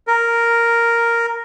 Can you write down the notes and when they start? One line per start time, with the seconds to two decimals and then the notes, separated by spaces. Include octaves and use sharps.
0.07 A#4